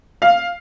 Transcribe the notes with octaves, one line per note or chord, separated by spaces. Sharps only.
F5